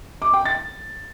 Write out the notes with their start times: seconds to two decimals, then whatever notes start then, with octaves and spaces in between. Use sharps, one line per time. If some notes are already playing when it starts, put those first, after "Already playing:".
0.22 D6
0.34 G5
0.45 A6